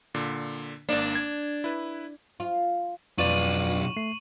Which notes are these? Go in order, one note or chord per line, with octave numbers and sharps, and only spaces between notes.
A#2 D3
G#1 A#3 D4
G#6
E4 B4
F4
B1 F2 F4 B4 D5 C#6 D#7 F#7
A3 C7